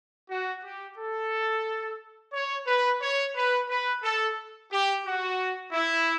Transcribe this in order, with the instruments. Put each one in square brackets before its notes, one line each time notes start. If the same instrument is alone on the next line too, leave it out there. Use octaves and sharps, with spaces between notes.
[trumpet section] F#4
G4
A4
C#5
B4
C#5
B4
B4
A4
G4
F#4
E4